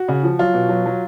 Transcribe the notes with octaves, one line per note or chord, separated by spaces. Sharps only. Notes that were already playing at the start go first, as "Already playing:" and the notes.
Already playing: F#4
C#3
F3
F#3 F4
B2
F#3
F#3